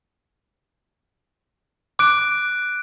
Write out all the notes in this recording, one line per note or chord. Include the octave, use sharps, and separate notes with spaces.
D6 F#6 D7